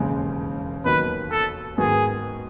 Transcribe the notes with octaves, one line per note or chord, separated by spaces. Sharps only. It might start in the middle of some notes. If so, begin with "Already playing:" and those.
Already playing: E1 D#2 C#3 G#3
D#2 D#3 F#3 B3 D#4 B4
A4
G#2 D#3 G#3 B3 F#4 G#4